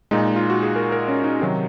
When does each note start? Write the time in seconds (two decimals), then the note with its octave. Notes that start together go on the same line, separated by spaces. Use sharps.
0.11 A#2 G#3 D#4
0.36 F4
0.50 F#4
0.63 G#4
0.76 A#4
0.92 A#4
1.08 C#4
1.24 D#4
1.40 C3 D#3 F#3